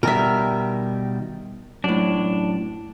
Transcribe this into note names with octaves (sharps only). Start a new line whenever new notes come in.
B2 D#3 G3 A#4 E5
F#2 A2 D4